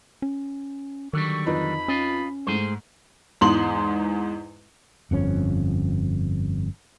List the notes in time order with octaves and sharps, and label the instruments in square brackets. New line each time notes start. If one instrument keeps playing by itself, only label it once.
[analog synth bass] C#4
[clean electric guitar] D3 F#3 G3 [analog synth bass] D#3 [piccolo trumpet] C#6
[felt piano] F2 D#4 B4 [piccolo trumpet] B5
[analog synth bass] C#4 [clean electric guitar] F4 D#5
[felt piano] G#2 A3 [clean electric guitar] G#4 C5
[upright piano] E2 G#2 C6 F#7
[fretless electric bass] G1 F2 C#4